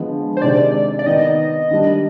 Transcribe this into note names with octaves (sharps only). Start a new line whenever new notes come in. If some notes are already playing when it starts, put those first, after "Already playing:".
Already playing: D3 F3 G#3 B3
C5
C3 D#3 G#3 D4 D5
D5
D#3 B3 D#4 D#5
D#3 G3 D4